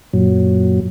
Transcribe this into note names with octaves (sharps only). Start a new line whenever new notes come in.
F#2 A#2 F#3